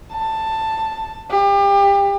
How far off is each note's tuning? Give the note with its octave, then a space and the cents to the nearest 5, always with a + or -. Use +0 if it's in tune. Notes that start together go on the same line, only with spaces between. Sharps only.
A5 +10
G4 +30